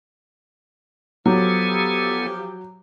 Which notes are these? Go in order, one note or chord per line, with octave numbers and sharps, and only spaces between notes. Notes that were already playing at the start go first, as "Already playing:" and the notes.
F3 F#3 B3 G4 A4 G#5